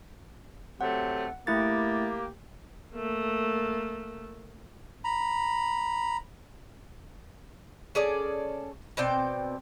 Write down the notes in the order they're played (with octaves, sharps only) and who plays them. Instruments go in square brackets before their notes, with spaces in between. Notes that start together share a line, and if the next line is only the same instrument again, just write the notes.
[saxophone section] C3 F#3 A3 [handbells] F#5
[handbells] A3 E4 A6 [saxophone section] A#3 G4
[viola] A3 A#3
[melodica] A#5 B5
[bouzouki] C#4 G#4 A4 D5
B2 C4 D5 G5